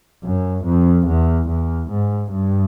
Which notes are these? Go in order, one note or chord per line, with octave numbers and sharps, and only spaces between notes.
F#2
F2
E2
E2
G#2
G2